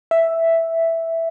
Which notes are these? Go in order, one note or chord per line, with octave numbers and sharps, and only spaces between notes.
E5